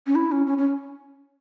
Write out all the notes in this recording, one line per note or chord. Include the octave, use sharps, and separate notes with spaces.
C#4
E4
C#4
C#4
C#4